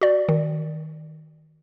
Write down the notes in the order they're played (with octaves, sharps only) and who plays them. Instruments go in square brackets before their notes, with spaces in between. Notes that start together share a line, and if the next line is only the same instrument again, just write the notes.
[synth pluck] F#4 D5
D#3